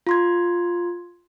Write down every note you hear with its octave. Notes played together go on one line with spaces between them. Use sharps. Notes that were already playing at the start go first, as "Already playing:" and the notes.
F4 C6 G#6